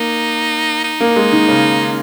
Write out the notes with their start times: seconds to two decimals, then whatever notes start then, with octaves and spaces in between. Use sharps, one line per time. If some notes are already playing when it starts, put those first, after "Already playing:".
Already playing: A#3 D#4
0.84 D#4
1.00 A#3
1.16 G#3
1.32 D#3
1.48 C#3